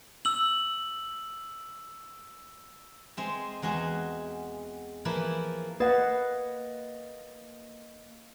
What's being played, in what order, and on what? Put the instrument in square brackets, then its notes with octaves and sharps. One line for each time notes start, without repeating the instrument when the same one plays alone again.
[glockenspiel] E6 F#7
[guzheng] G#3 C4 E5
E2 G#3 F#4 G#4 E5
E3 F3 A#3 E4 B5
[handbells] A#3 D#5 A6 [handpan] B4 F#5